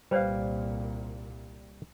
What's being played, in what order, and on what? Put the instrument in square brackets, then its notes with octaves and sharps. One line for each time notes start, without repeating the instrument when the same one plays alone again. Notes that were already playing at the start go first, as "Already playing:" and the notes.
[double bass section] C2 A#2 [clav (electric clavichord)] G3 F5 [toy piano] B4 C5 D5